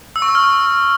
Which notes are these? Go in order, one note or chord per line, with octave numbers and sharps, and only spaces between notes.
E6
C#6
E6
F6